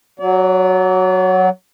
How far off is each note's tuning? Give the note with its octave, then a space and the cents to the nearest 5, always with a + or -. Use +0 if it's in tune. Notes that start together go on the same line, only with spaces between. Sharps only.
F#3 +0 D5 -40